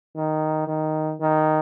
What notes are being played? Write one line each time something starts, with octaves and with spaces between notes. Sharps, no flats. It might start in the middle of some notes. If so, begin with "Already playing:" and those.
D#3
D#3
D#3